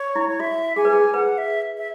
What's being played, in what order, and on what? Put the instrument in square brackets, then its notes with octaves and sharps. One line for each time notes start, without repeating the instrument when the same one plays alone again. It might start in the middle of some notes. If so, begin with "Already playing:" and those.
Already playing: [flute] C#5
[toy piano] E4
[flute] C#5
[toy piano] F#4 [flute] E5
[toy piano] G#4 [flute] G#5
[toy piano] B4
G#4
[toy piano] B4 [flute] F#5
[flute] E5
E5